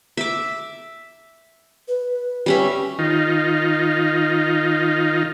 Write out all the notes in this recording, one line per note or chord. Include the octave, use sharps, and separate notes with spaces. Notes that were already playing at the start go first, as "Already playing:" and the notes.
E5 D6
B4
G3 C#4 E5
D#3 D#4 F4